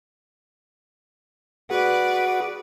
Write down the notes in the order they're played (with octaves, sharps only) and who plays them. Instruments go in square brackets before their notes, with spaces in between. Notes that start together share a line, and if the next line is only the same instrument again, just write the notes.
[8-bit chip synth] F#4 G#4 F#5 [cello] B4 D5